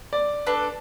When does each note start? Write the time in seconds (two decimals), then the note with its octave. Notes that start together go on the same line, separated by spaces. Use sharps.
0.13 D5
0.46 D4 A4 B4